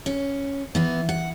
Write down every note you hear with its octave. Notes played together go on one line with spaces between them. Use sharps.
C#4
E3 B3
F#5